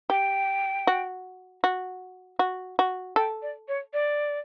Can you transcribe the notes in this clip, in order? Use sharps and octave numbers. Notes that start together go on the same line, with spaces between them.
G4 G5
F#4
F#4
F#4
F#4
A4 G5
D5
C#5
D5